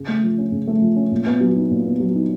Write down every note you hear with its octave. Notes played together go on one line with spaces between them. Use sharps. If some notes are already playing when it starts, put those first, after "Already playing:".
Already playing: C#3
A3
F3
C#4
C#3
A3
F3
C#4
A#2
B3
F#3
D#4
A#2
B3
F#3
D#4